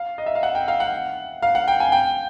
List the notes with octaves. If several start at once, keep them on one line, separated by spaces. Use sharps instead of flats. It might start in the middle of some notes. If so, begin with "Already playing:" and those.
Already playing: F5
D#5
E5
F5
F#5
G5
F5
F#5
F5
F#5
G5
G#5
G5